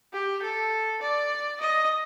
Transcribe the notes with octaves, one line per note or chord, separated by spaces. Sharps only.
G4
A4
D5
D#5